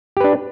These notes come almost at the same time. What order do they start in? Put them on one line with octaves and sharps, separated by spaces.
G4 B4 D4